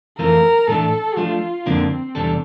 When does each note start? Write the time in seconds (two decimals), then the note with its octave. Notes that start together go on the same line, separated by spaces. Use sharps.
0.19 F2 E3 A3 C4 F4 A#4
0.68 A2 E3 A3 D4 A4
1.17 F3 A3 D4 F4
1.66 F2 D3 F3 A#3 C4 D4
2.15 E2 C3 G3 D4 A4